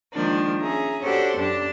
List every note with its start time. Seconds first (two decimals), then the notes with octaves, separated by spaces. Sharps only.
0.13 D#3 F3 G#3 A#3 D4
0.61 C#4 G#4 E5 A#5
1.02 D4 F#4 G4 A4 C5 C#5
1.37 F#2 D4 G4 A5